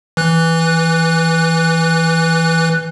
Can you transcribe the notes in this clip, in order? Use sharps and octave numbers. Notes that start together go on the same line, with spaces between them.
E3 F#6